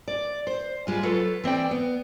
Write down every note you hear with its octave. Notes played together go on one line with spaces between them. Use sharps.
D5
C5
G3 G#3 F4
F#3 F4 A4 B4
E3 C4 D5 G5
B3